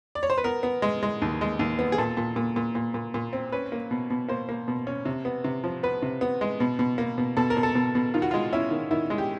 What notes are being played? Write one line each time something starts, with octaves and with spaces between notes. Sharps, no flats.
D5
C#5
C5
B4
B3 A#4
B3
G#3
G#3
D#2
G#3
D#2
B3
G#4
A#2 A4
A#2
A#2
A#2
A#2
A#2
A#2
C4
C#4 B4
A#3
B2
B2
A#3 C5
A#3
B2
C#4
C3
B3
C3
F3
B3 B4
C3
B3
G#3
B2
B2
A#3
B2
B2 A4
A#4
B2
A4
B2
B2
D#3 F4
F#4
F4
G#3
C#4 E4
D#3
D#3 E4
G#3
G4